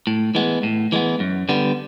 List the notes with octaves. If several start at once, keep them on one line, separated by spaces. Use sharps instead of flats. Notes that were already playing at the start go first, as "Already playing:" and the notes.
A2
E3 G#3 B3
A2
E3 G#3 B3
F#2
D3 G3 B3